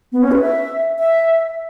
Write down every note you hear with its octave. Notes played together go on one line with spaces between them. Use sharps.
B3
C#4
B4
E5
E5